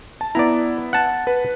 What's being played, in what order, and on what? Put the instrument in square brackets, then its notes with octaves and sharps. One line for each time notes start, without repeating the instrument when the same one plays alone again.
[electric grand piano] A5
[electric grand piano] B3 E4 [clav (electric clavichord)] D5 A#5
[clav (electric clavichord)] F#5 A5
[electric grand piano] B4